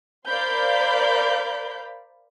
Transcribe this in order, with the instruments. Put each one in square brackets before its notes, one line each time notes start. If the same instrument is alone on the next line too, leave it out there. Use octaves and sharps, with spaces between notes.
[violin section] A#4 C5 D5 F5 B5 G6